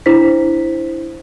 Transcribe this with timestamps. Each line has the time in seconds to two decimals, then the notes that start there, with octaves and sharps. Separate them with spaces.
0.06 D4 E4 C5 B6